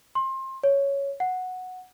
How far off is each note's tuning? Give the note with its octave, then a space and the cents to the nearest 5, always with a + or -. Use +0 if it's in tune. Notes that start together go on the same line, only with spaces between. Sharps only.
C6 +25
C#5 +5
F#5 -5